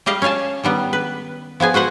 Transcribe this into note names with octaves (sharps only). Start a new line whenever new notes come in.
G3 G4 D#5 F5
C#4 C#5 F5 G#5 A5
D#3 G3 B3
B4
F3 B3 G#4 G#5
F#4 B4 C5 F#5